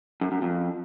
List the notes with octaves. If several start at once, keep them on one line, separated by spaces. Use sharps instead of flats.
F#2
F#2
F2